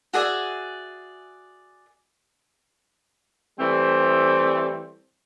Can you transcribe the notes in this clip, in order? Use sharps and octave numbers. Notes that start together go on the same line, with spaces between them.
F#4 G#4 D5 E5
E3 G3 A3 C4